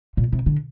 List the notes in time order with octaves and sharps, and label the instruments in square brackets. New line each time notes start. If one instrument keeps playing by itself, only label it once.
[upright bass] A#2
C3
D3